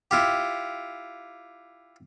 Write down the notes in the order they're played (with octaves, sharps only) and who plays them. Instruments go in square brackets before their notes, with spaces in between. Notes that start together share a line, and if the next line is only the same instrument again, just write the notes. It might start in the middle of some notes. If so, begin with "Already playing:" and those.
[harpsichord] E4 F4 G4